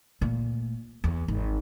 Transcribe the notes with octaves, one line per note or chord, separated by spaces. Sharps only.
A#2 A3
E2
G#1